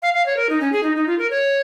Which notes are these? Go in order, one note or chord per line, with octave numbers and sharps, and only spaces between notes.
F5
F5
C#5
A#4
D#4
C#4
G#4
D#4
D#4
F4
A#4
C#5